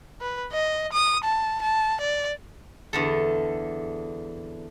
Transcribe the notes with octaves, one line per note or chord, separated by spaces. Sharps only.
B4
D#5
D#6
A5
A5
D5
E2 D3 A4